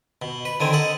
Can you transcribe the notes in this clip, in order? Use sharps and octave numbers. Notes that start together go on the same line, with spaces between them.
B2
B4
D3 D#3 C4 G#5
A4 D#5 F#5